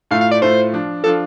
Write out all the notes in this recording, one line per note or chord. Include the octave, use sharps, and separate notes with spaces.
A2 A3 F4 F5
F5
D5
A2 A3 F4 C5
F3 D4 F4
F3 D4 F4 A4